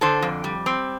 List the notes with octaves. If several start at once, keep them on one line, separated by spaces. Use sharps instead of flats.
D3 A4 C5
F2
G3
C4